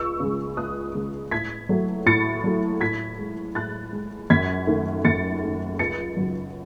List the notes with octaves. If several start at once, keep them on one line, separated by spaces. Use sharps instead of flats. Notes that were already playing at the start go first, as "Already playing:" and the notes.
Already playing: C#2 C#6 E6
C#3 G#3
C#2 D#6 F#6
C#3 G#3
A2 G#6 B6
F#3 A3
A2 A6 C#7
F#3 A3
A2 G#6 B6
G#3
A2 F#6 A6
G#3
F#2 G#6 B6
D#3 A3
F#2 A6 C#7
D#3 A3
C#2 A6 C#7
C#3 F#3